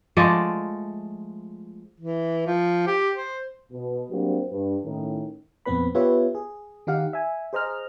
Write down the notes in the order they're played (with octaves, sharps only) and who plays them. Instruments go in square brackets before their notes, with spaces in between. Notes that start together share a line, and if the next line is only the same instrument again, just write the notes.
[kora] F3 G#3 A3 D5
[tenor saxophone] E3
F3
G4
C5
[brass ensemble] B2
F#3 G3 A#3 C4 D4 F#4
G2
A2 D#3 C#4
[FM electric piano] F2 A#2 B3 C4 B4 B5
B3 F4 G4 B4 C#5 E5
G#4
D#3 D#4 G4 F5 F#5
E5 G#5
G#4 C5 D#5 A#5 F6